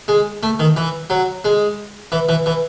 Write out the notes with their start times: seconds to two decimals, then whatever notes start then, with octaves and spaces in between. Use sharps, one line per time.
0.08 G#3
0.43 A3
0.60 D#3
0.77 E3
1.10 F#3
1.45 G#3
2.12 E3
2.29 E3
2.46 E3